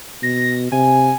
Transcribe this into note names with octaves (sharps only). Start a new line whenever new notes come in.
B2 A#6
C3 G#5